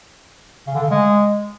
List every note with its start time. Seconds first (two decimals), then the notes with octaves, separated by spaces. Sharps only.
0.67 C#3
0.75 D3
0.83 C#3
0.91 G#3